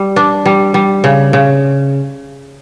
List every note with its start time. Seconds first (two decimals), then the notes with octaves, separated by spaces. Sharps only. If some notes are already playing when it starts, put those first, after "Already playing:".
Already playing: G3
0.16 D4
0.46 G3
0.74 G3
1.04 C#3
1.33 C#3